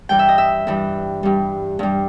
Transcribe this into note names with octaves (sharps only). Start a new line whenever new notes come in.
G2 E3 G3 G5
E5
D#5
E5
G2 E3 G3
G2 G3
G2 G3